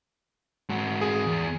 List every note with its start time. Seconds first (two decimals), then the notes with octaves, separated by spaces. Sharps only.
0.69 G#2 F#4
1.01 G#4
1.26 E2